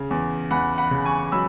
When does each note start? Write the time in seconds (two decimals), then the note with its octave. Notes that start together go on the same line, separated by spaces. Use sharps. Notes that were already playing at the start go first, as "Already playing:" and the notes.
Already playing: C#3
0.11 E2
0.51 E2 F#5 B5
0.78 F#5 B5
0.91 C#3
1.05 G#5 C#6
1.32 F#3 B5 E6